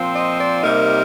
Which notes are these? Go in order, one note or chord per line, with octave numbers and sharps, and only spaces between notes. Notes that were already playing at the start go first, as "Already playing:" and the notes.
Already playing: A#2 F3 C4
D#5
D5
C3 G3 A#3 D#4 A#4